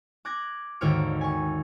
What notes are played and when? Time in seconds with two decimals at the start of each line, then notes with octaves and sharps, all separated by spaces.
0.25 D6 F#6 G#6 A#6
0.81 G#1 D#2 D3 C#5 F6 D7
1.21 G#5 C#6